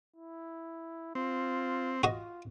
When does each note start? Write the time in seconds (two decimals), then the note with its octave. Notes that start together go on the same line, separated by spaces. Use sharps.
0.16 E4
1.15 C4 F4
2.03 F4 F#4 D#5